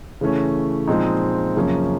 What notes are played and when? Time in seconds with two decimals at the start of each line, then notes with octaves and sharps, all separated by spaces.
0.21 C#3 E3 A3 C#4
0.88 A#2 F3 G#3 C4 D#4
1.56 F#2 C#3 F3 A#3 C#4